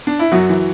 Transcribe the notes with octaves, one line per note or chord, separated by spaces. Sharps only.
D4
E4
F#2 F#3 F#4
E3